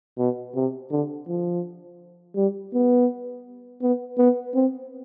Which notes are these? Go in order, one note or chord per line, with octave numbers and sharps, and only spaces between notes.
B2
C3
D3
F3
G3
B3
B3
B3
C4